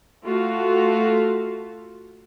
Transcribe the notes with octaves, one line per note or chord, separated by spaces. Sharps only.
A3 F4 F#4